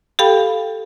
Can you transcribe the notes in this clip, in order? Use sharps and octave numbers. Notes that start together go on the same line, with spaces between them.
G4 A4 F5 G5 B5